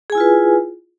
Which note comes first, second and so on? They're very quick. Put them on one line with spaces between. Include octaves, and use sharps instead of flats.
G#4 G#5 E4 F4 B4